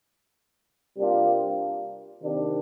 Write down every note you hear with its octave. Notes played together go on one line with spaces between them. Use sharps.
C3 G3 A#3 D4 F4
C3 D#3 A#3 D4